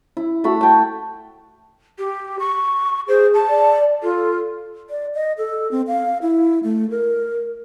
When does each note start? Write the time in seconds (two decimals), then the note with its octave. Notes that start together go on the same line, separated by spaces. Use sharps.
0.17 E4
0.44 A3 F#4 B5
0.61 G5 A5
1.99 G4
2.40 C#6
3.08 G#4 C5
3.34 A5
3.50 D5
4.03 F4 A4
4.90 D5
5.15 D#5
5.38 A4
5.71 C4
5.87 F5
6.22 E4
6.64 A3
6.90 A#4